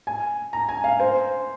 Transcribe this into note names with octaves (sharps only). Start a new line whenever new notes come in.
G#5
A#5
G#5
F5
C5